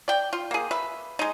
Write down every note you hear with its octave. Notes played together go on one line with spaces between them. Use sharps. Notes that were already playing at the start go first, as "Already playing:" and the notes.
D5 G5
F4
A#3 G#4
B4 E5
G#3 D#4